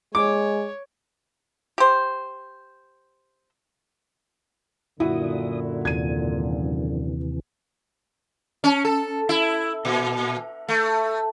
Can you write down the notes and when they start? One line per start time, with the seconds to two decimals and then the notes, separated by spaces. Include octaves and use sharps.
0.15 G#3 C#5 D6
1.78 G4 C5
5.00 F#2 A#2 D3 E4 F#4 D#6
5.85 D#2 C3 E3 G#6 D#7
8.64 C#4
8.85 A4
9.29 E4
9.85 A#2
10.69 A3